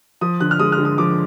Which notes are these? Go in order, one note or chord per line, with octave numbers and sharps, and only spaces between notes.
F3 D#6
D3 F#6
F6
G#3 D#6
F6
D3
D#6
F3 D6